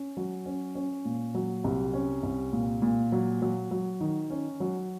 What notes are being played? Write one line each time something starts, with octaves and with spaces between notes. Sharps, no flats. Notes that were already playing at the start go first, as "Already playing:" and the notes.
Already playing: C#4
F#3
C#4
C#4
A#2
F#3
C2
C#4
C2
A#2
A#2
F#3
F#3
F#3
D#3
C#4
F#3